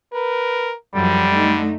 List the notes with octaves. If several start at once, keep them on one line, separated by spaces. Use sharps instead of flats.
A#4 B4
F#2 D3 F3 G3
A3 D#4